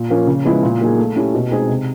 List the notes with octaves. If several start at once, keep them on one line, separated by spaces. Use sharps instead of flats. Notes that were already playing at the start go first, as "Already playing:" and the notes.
Already playing: A#2
F3 A#3 C#4
C#3
F3 G#3 B3 E4
A#2
F#3 A#3 D#4 G#4
A3
C#4 E4 G4
B2
G#3 C4 D#4 G#4
C3